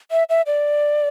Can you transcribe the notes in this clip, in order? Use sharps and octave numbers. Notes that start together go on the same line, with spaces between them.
E5
E5
D5